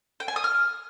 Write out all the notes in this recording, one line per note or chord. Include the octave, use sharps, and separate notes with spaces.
G5
G#5
D#6
F6